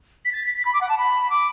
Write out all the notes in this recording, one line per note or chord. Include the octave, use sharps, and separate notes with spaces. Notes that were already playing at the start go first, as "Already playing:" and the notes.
B6
A6
B6
B6
B5
D6
F#5
A5
B5
D6